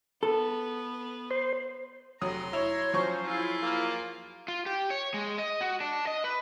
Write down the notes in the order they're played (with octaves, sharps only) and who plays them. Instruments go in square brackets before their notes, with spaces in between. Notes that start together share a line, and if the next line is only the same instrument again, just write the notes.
[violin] B3 [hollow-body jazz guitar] A4
[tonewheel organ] C5 C6
[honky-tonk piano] F1 F#3 D#6 [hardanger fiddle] A#5 C6
[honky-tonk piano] E4 F7 [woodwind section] C#5
[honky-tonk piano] F3 F#3 C#6 [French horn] C#4 [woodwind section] C5
[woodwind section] E4 [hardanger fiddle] F4 G#4
[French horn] A#3
[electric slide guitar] F4
G4
C#5
G#3
D#5
F#4
D4
D#5
B4